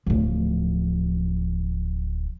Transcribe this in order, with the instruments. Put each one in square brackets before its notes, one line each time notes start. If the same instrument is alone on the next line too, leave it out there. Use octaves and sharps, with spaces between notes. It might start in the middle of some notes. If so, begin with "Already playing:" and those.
[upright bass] D1 F3